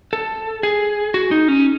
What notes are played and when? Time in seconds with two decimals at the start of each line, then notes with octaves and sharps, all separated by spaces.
0.13 A4
0.63 G#4
1.14 F#4
1.31 D#4
1.48 C#4